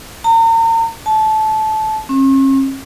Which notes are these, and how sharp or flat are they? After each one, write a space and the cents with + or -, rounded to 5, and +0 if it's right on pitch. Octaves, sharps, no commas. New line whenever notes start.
A#5 -40
A5 -20
C#4 -45